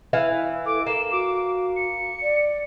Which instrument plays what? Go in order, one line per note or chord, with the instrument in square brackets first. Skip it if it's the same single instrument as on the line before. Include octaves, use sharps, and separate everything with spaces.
[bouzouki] E3 E4 F5
[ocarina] A4 [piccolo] D6
[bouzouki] A#3 [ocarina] A4 [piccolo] E7
[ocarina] F#4 [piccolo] D6
[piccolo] C#7
[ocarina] D5